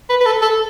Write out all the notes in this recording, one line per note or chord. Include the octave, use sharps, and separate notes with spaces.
B4
B4
A4
A4